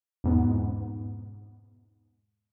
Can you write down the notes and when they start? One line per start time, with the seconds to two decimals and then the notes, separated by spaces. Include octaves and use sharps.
0.24 E2 G#2 B2 B3